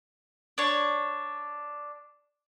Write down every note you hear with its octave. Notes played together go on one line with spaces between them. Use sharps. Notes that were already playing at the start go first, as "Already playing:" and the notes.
D4 C#5